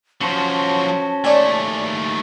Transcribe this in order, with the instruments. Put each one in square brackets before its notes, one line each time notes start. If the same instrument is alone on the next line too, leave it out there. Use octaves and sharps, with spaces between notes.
[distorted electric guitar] F3 F#3 [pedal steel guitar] C#4 F#4 C5 [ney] A5
[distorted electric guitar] D#2 A3 [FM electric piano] C#5 D5 G#5